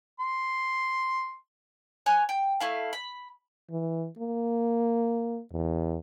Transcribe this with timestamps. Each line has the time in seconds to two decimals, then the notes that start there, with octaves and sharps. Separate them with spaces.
0.19 C6
2.06 C#5 G#5 F#6
2.29 G5
2.60 A3 E4 F5
2.93 B5
3.70 E3
4.19 A#3
5.52 E2